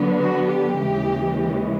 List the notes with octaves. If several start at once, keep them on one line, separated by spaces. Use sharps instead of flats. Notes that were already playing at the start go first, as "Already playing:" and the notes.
Already playing: D3 F#3 B3
F#4
G4
D#2 C#3 E3 G#3